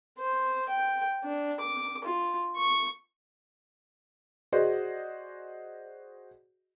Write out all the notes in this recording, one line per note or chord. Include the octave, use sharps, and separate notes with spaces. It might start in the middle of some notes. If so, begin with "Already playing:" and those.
C5
G5
D4
D6
F4
C#6
F#4 G#4 C5 D5 D#5 F#5